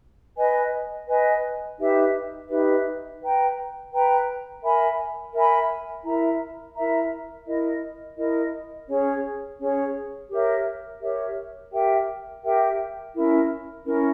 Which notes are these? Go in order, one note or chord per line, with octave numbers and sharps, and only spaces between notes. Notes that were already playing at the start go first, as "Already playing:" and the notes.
B4 D#5 G#5
B4 D#5 G#5
D#4 G4 B4 E5
D#4 G4 B4 E5
B4 G5 A#5
B4 G5 A#5
A#4 E5 G#5 B5
A#4 E5 G#5 B5
E4 A#4 E5 A#5
E4 A#4 E5 A#5
E4 A#4 D#5
E4 A#4 D#5
C#4 G#4 C#5
C#4 G#4 C#5
G4 A#4 C#5 E5
G4 A#4 C#5 E5
G4 A#4 E5 G5
G4 A#4 E5 G5
C#4 E4 A#4
C#4 E4 A#4